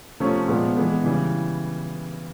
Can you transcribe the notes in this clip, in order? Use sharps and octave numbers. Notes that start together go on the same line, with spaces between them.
C3 F3 A3 C#4
A#2 F3 G#3 B3
E3 G#3 B3
C#3 E3 G3